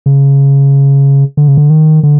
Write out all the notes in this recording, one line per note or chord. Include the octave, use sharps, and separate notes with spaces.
C#3
D3
C#3
D3
D#3
D3